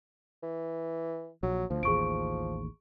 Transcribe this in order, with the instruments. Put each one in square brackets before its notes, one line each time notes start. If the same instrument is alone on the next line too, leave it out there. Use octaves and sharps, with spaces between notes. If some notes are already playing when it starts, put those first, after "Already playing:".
[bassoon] E3
[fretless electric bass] A#1 [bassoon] F#3
[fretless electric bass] D2 [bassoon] F3
[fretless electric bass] A1 D#2 [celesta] G#4 C#6 D7